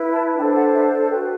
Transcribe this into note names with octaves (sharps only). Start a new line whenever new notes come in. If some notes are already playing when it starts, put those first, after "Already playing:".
Already playing: E4 B4
A5
D4 A4 C5 G5
F#5
E5
F#4 B4 G5